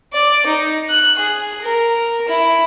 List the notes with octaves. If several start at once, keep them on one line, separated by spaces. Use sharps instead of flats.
D5
D#4
F#6
G#4
A#4
E4